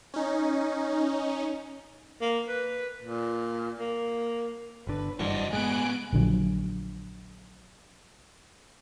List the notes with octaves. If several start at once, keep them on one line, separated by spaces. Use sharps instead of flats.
C#4 D#4
A#3
B4
A#2
A#3
G1 D3 B4
F#1 G2 E3 F#4 C5 D5 D#5
A2 G#3 B3 G#5 F#6 D7
A#1 D3 F3 F#3